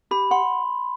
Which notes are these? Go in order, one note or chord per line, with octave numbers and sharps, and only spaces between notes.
G4 B5
F#5 C6